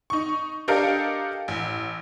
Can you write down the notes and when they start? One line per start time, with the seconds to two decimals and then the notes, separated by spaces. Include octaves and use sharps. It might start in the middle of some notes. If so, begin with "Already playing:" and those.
0.10 D#4 C#6
0.68 D4 G4 A4 A#4 D#5 F5
1.48 A1